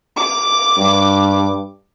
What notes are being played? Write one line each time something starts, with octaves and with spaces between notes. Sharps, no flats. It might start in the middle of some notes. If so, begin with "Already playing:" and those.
D6
G2